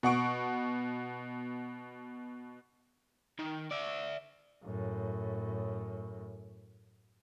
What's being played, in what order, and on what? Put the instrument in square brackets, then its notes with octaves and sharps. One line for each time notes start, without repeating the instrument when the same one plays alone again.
[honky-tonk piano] B2 F#5 C#6 D7
[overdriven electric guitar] D#3
D5 E5
[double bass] F#2 A2